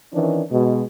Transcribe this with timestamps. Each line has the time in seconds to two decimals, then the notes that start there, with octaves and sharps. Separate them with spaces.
0.14 D#3 E3 C#4 D4
0.51 B2 G#3